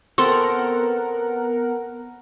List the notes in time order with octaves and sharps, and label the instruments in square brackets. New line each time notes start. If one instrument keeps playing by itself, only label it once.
[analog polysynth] B3 A#4 F#5 [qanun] C4 A4 [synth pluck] C6